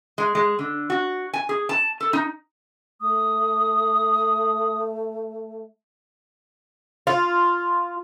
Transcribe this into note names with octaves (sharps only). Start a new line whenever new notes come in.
G#3
G#3
D3
F#4
G#5
G#4
A5
A4
D#4
A3 D#6
F4